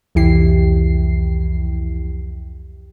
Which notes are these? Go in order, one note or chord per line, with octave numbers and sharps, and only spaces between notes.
C2 F2 E3 E4 G4 C7